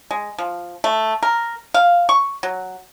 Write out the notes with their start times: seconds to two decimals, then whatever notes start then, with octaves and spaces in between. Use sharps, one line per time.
0.11 G#3
0.38 F3
0.84 A3
1.23 A#4
1.74 F5
2.09 C#6
2.43 F#3